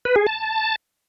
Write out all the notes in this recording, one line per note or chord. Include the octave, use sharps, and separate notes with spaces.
B4
G#4
A5